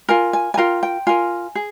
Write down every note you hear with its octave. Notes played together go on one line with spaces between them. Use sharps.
F4 A#4 G#5
G#5
G#5
F4 A#4 G5
G5
F4 A#4 G#5
G#4